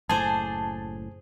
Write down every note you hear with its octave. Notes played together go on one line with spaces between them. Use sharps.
F#1 A2 G#4 C5 G#5 A5 D6